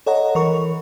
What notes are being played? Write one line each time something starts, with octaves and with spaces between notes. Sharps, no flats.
A4 C#5 D#5 F#5 A#5
E3 A#4 C#6